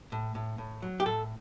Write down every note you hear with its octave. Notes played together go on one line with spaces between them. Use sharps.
A2
A2
A2
F#3
G4
A2 A4